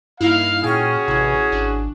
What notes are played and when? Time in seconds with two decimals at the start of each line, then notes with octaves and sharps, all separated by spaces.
0.20 G2 A#3 D#4 E4 F5
0.64 A#2 C#4 F#4 G#4 G5 F6
1.08 A1 C3 E4
1.52 G#1 D4